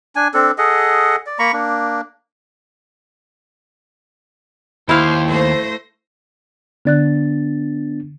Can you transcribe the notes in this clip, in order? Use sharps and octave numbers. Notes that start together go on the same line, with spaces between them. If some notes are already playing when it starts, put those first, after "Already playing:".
D4 G#5
C4 D4 A4
G#4 A4 D#5 F#5
D5
A#3 A#5 B5 C#6
A#3 D4
D#2 E4 C5 F5
A3 C5 A#6
D3 B3 D4 D5 F#6 A6